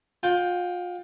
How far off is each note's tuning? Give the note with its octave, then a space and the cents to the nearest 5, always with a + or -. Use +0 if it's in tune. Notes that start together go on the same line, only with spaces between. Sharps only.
F4 +30 G5 +0